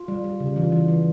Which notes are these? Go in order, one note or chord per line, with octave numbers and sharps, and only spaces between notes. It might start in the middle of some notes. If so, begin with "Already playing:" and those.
Already playing: F4
G3
G3
C#3
E3 F4
E3
E3